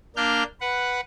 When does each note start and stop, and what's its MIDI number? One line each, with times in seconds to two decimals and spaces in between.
0.16 0.43 58
0.16 0.43 62
0.16 0.43 89
0.16 0.43 91
0.61 1.01 71
0.61 1.01 78